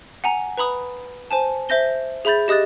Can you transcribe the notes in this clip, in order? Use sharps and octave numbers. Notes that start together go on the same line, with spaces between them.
F#5 G#5 A#5
B4 A#5 B5 D#6
C5 G#5 A5
C5 E5 G6 A#6 G7
G#4 E5 B5 G6 A6
G4 D#5 D#6 F#6 A6